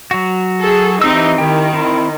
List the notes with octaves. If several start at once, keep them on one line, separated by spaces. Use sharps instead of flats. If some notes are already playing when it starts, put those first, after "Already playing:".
F#3 F#4
G#4 A4
E3 C4 D#4 G4 E6
D#3 E4 G4 G5
C4 E4